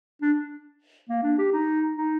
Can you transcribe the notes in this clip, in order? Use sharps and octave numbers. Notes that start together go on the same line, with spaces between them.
D4
A#3
D4
G4
D#4
D#4